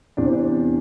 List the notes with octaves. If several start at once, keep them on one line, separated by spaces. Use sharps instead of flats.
E2 C3 E3 D4
C4
D4